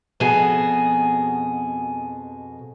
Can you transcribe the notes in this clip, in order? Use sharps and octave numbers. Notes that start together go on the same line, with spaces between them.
F2 B2 F#4 G#4 G#5